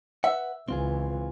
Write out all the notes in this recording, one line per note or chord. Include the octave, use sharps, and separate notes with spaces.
B4 E5 F#5
C#2 E3 C4 F4 G#4